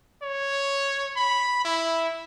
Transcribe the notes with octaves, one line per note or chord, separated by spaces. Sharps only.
C#5
B5
E4